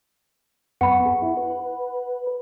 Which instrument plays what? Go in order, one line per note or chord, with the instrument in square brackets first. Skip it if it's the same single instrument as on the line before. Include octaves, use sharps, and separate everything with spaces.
[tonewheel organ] F#2 B3 C#6 [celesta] F#5 B5
[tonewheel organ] G#4
E4
B4